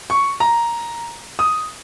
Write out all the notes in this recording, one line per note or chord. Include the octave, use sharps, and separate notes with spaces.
C#6
A#5
D#6